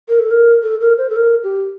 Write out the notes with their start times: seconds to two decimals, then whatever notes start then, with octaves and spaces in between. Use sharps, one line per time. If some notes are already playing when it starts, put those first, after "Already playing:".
0.08 A#4
0.19 A4
0.31 A#4
0.63 A4
0.81 A#4
0.98 C5
1.10 A4
1.16 A#4
1.44 G4